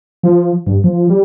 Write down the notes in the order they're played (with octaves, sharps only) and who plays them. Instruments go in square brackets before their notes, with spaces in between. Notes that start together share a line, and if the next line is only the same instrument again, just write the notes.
[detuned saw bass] F3
G2
F3
G3